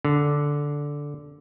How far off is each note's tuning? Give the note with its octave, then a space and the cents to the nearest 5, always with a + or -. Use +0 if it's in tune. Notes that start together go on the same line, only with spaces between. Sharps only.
D3 -10